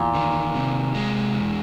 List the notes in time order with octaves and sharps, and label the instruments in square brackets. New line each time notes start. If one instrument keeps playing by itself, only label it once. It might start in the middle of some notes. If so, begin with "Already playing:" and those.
Already playing: [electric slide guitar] E2 [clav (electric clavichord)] A#2
[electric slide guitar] D#3
C3
G#3
E2